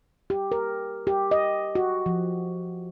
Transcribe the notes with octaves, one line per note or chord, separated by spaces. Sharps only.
G4
A#4
G4
D#5
F#4
F3